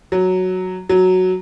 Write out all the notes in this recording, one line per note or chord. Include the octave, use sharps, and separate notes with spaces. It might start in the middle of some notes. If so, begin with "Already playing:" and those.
F#3
F#3